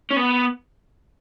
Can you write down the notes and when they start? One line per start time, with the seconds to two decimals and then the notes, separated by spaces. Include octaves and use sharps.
0.11 C#4
0.17 B3